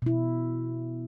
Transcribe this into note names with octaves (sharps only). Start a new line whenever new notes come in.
B2 E4